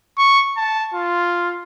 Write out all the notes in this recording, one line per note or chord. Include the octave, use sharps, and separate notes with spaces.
C#6
A5
F4